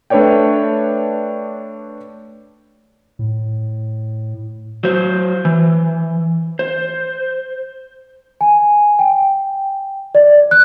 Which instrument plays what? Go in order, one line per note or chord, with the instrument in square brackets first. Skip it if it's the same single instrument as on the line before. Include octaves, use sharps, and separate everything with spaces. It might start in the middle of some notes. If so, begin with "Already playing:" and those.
[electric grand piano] A3 D4 B4 C#5 D5 G5
[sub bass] A2
[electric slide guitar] F#3 C5
E3
C5
[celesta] G#5
G5
D5
F#6